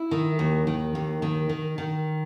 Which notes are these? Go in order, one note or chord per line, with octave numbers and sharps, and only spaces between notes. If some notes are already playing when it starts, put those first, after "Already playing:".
Already playing: E4
D#3
D#2
D#3
D#2
D#3
D#3
D#3